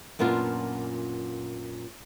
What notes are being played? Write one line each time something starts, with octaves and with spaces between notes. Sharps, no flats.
F#2 A#2 B3 D4 F4